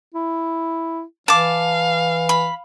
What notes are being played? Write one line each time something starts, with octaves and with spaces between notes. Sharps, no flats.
E4
E3 F5 A5 D6
B5